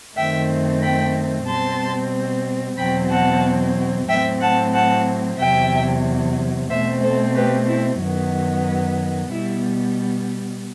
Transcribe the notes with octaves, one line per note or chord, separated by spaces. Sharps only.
F#2 D#3 A3 C4 E5 G5
G5 B5
B2 G3 C4 A5 C6
E2 B2 F#3 C4 G5 B5
F#5 A5
A2 F#3 C4 E5 G5
F#5 A5
F#5 A5
E2 C3 F#3 E5 G5
B2 A3 C4 C5 E5
A4 C5
G4 B4
E4
F#2 D#3 F#3 B3
B2 G3 B3 E4